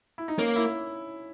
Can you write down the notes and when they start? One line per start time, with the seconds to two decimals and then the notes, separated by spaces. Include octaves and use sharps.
0.18 E4
0.28 D#4
0.39 A#3 C#4
0.56 E4